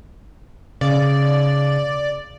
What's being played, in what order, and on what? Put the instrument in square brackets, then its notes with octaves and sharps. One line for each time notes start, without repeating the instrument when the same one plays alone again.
[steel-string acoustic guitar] C#3 [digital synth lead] D5